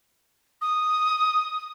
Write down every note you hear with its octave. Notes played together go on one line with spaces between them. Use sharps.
D#6